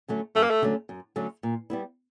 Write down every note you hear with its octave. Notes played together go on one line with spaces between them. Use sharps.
D3 F#3 A3 C#4
F#2 A3
A#3
A3
D3 F#3 A3 C#4
F#2
D3 F#3 A3 C#4
A#2
G3 B3 E4